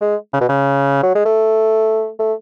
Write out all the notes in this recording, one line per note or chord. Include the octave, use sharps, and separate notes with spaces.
G#3
C#3
B2
C#3
F#3
G#3
A3
A3